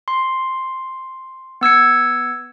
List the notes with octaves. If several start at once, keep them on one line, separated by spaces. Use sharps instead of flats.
C6
B3 E6 G#6 C#7